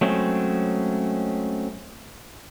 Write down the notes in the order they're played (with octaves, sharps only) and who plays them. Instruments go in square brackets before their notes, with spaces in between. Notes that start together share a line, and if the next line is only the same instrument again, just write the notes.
[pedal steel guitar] F#3 G#3 A3 C4 C#4